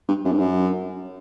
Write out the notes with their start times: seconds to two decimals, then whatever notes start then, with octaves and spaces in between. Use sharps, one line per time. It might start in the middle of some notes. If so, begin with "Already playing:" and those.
0.08 G2
0.25 F#2
0.32 G2
0.39 F#2